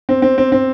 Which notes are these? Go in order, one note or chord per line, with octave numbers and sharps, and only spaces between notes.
C4
C4
C4
C4